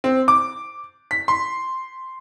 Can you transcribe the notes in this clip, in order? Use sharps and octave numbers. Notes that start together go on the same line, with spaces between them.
C4
D6
B6
C6